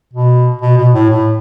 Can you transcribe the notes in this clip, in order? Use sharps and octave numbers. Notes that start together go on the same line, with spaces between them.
B2
B2
B2
A2
A2